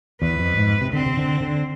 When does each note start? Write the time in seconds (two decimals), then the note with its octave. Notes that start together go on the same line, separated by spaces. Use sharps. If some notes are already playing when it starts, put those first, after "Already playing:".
0.22 E2 B4
0.39 F2
0.57 G#2
0.81 C3
0.93 D3 C4
1.06 C3
1.17 D3
1.40 D3